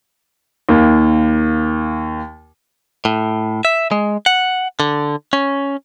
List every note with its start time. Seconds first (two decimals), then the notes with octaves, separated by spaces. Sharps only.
0.69 D#2 A#3
3.05 A2
3.65 E5
3.91 G#3
4.26 F#5
4.80 D3
5.33 C#4